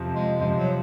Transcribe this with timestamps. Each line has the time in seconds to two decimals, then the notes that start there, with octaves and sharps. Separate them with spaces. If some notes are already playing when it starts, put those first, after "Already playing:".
Already playing: F2 C3 F3
0.15 G#3
0.40 F2 C3 F3 G#3
0.58 F#3